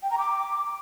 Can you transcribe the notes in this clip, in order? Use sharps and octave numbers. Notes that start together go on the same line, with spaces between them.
G5
A#5
D6